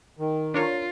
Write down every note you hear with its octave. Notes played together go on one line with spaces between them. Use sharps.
D#3
D4 F4 A#4 C#5